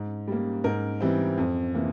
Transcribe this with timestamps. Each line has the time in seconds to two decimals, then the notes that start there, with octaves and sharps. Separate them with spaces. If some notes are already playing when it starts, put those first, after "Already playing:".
Already playing: G#2
0.28 G3 A#3
0.64 G#2 A#4
1.01 E3 G3 C4
1.38 F2
1.74 C3 E3 A#3